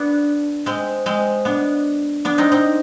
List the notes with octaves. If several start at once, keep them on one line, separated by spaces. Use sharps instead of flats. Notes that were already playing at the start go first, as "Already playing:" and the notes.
Already playing: B3 D4
G#3 C4
G#3 C4
B3 D4
B3 D4
C4 D#4
C4 D#4